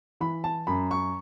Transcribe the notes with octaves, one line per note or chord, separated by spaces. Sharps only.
E3 B5
A5
F#2 B5
C#6